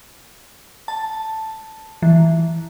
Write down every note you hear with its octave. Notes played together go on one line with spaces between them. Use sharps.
A5
E3